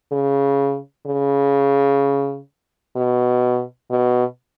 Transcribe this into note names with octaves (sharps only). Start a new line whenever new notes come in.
C#3
C#3
B2
B2